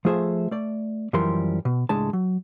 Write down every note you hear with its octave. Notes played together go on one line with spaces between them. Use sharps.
F3 A3 F4 G#4 C5 E5
A3 D5
F#2 E3 F3 G3 A#4 C6
B2
C#2 A2 G#3 D4 A5
F#3